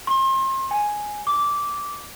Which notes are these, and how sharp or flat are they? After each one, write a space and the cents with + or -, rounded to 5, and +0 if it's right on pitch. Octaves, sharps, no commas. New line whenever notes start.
C6 +35
G#5 +0
D6 -15